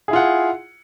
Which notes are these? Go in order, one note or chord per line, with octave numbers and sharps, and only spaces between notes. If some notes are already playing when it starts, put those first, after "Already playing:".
E4 F4 G#4 F#5